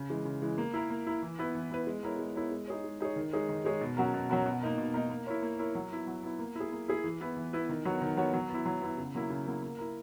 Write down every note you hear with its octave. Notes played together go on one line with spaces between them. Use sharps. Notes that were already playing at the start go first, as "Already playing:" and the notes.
Already playing: C#3
E3 G#3
C#3
E3 G#3
A#3
E4 A#4
A#3
E4 A#4
E3
B3 E4 B4
E3
B3 E4 B4
G#3
B3 E4 A#4 C#5
G#3
B3 E4 A#4 C#5
G#3
D#4 G#4 C#5
G#3
D#4 G#4 C#5
D#3
G#3 D#4 G#4 C#5
D#3
G#3 D#4 G#4 C#5
B2
F#3 C#4 F#4 A#4
B2
F#3 C#4 F#4 A#4
B2
A#3 D#4 A#4
B2
A#3 D#4 A#4
A#3
E4 A#4 C#5
A#3
E4 A#4 C#5
F#3
B3 E4
F#3
B3 E4
A#3
E4 G#4
A#3
E4 G#4
E3
B3 E4 B4
E3
B3 E4 B4
D#3
F#3 B3 F#4 C#5
D#3
F#3 B3 F#4 C#5
F#3
B3
E4
F#3
B3 E4
C#3
F#3 A#3 E4
C#3
F#3 A#3 E4
A#3
E4 A#4